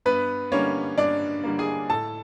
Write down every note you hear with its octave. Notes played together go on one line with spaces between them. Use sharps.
G2 B3 B4
D3 G3 A#3 C#4 C#5
G2 D4 D5
D3 G3 A#3
G#4 G#5
A2 A4 A5